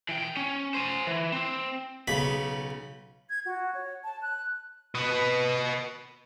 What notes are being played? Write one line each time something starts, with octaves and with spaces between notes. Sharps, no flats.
E3 G5
C#4
C5 G#5
E3
C4
B1 C#3 B5
G#6
F#4
C#5
A5
F#6
B4 D#5